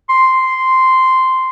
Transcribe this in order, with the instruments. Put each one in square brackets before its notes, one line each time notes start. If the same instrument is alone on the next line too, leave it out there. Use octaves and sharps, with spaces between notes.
[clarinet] C6